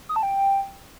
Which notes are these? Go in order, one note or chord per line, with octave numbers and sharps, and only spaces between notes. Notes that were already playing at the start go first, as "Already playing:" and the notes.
D#6
A5
G5